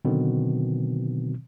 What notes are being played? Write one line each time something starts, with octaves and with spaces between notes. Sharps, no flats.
B2 D3 D#3 F#3 C4